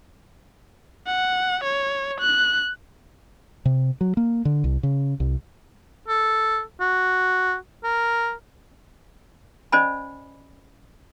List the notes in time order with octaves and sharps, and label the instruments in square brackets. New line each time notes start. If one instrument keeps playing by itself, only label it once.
[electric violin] F#5
C#5
F#6
[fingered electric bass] C3
F#3
A#3
D3
C2
C#3
C2
[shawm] A4
F#4
A#4
[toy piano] C#4 C5 D5 D#5 G#5 B5